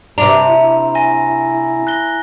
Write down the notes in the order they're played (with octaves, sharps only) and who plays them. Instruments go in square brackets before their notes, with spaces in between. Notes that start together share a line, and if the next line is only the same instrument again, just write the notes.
[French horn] G2 [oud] C3 D4 [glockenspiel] A#5
[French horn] E4
[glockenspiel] G#5 A#6
F#6 A#6 G7